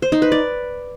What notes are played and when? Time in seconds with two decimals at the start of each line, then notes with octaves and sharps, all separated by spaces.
0.02 C5
0.12 D#4
0.22 B4
0.32 D5